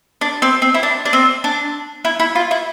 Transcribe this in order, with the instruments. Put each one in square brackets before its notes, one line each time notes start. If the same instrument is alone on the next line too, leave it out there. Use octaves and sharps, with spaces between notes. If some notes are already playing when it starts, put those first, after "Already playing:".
[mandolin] D4
C4
C4
E4
D4
D4
C4
D4
E4
E4
F4
E4